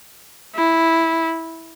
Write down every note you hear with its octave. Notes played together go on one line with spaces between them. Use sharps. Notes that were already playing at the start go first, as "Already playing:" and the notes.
E4